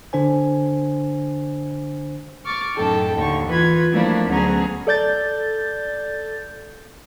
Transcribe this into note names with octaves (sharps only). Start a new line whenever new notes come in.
D3 D4 C5 G#5
C#6 D6 F6 A6
F#2 A2 D#3 A4 G5 A5
D#2 D3 C#6
E3 F4 B4 G#6
F3 G3 A3 A#3 D4 E4
D2 F#3 B3 C#4 G#4 A#5
A4 D5 G6 A6